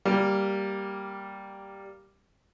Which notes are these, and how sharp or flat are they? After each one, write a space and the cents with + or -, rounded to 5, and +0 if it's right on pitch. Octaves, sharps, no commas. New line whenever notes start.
G3 +0 A#3 +0